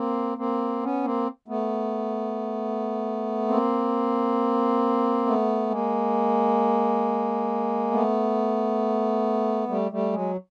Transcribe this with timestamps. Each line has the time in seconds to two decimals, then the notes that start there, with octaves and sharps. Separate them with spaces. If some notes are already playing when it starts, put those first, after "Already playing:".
Already playing: A#3 C4
0.37 A#3 C4
0.82 B3 C#4
1.04 A#3 C4
1.48 A3 B3
3.48 A#3 C4
5.26 A3 B3
5.70 G#3 A#3
7.91 A3 B3
9.69 G3 A3
9.91 G3 A3
10.13 F#3 G#3